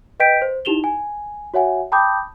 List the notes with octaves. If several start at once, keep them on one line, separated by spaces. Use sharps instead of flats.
B4 D#5 G5 G6 B6 D7
C5
D#4 E4 G4 E7 F7 G7
G#5
F#4 C#5 E5 F#5 G#5
G5 A5 B5 D6 D#6 G6